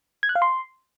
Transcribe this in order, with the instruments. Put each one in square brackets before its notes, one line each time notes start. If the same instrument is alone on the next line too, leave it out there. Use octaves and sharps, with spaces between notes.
[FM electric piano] G#6
F#6
F5
C6